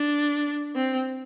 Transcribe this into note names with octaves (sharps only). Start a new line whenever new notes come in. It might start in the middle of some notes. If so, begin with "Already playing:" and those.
Already playing: D4
C4